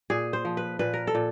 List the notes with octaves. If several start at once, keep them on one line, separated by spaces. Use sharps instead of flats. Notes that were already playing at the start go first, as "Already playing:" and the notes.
A#2 G#4
C5
F3
B4
A#2 B4
A#4
A4
A#2